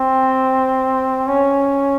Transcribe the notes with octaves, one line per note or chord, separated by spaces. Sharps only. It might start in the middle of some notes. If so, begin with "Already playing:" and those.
Already playing: C4
C#4